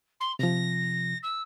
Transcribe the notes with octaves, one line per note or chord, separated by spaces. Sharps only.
C6
C3 F3 A#6
E6